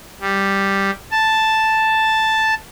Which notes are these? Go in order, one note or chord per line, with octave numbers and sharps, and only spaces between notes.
G3
A5